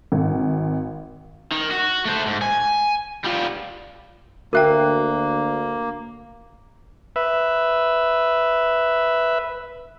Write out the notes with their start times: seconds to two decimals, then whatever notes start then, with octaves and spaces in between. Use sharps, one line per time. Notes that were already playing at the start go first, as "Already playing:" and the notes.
0.12 G#1
1.52 D#3
1.71 F#4
2.05 A3 C5
2.27 G#2
2.42 G#5
3.24 G3 F4
4.53 D2 A#3 F#4 A#4 E5 G5 F#6
7.16 B4 E5